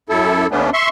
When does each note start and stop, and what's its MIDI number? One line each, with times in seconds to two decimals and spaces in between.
0.09 0.47 42
0.09 0.47 64
0.09 0.47 69
0.51 0.70 39
0.51 0.70 57
0.51 0.70 59
0.51 0.70 61
0.51 0.70 62
0.73 0.89 76
0.73 0.89 84
0.73 0.89 85